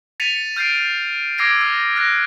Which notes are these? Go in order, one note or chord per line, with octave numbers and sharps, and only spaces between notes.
A6 B6 C#7 D#7 F7
F6 G6 A6 C7 D7
D6 E6 G#6 A#6 C7 D7
F6
F6 F#6 A#6